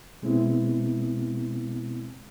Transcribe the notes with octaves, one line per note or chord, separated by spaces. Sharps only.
B2 G#3 B3 C4 E4